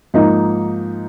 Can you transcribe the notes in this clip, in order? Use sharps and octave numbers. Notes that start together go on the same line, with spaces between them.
G#2 F3 A#3 D#4